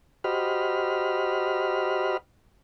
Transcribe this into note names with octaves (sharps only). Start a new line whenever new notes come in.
F#4 G4 C5 D#5 B5 F6